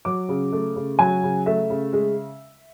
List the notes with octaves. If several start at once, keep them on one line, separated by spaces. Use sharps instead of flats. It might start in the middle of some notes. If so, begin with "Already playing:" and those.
F#3 D6
C#3
A3
C#3
F#3 G#5
C#3
A3 E5
C#3
G#3